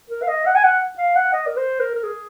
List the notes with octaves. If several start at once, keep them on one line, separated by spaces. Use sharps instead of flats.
A#4
F5
D#5
F#5
G#5
F#5
F5
F#5
D#5
A#4
C5
A#4
A#4
G#4